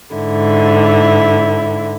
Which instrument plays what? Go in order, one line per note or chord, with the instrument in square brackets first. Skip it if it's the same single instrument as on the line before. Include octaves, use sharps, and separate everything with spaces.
[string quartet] G#2 D3 E4